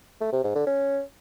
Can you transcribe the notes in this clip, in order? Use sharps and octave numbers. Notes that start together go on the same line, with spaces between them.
A3
C3
G#2
D3
C#4